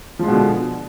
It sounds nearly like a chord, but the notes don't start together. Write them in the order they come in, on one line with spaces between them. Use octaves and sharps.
F3 G#3 B2 D3